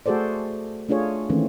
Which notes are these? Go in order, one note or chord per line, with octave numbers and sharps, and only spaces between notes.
A3 F#4 G#4 A4 C5 D5
A3 D4 F4 G#4 C#5
D#3 E3 A3 A#3 C4 C#4